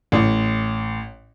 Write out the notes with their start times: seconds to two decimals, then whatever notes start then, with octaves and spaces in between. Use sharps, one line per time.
0.12 A1